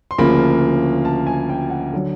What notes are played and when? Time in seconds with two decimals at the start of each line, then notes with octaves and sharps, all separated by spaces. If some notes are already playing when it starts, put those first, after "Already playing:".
0.11 C6
0.18 D2 C#3 F3 A#3 B5
1.05 A5
1.27 G#5
1.49 G5
1.70 F#5
1.93 D3 F#3